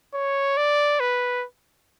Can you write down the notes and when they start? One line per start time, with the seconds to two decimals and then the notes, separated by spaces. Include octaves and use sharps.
0.14 C#5
0.57 D5
1.00 B4